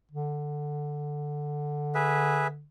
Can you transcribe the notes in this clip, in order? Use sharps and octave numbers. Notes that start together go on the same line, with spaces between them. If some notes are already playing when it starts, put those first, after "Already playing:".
D3
G#4 B4 E5